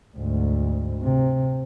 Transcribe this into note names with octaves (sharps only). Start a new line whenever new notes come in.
D2 G#2
C3